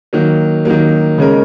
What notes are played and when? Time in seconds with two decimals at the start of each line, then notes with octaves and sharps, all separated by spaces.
0.13 D#3 F#3 A#3
0.65 D#3 F#3 A#3
1.18 C#3 G#3 C#4 A#4